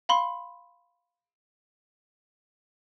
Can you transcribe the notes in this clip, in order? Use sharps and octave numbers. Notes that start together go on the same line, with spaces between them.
F5 B5 C6